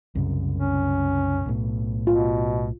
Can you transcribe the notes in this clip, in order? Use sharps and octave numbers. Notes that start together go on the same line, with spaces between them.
C2 F#2 C#3
C#4
B1 A2
B2 F4